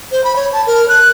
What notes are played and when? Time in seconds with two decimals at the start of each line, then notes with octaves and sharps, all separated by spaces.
0.12 C5
0.24 B5
0.36 C#5
0.53 A5
0.67 A#4
0.89 F#6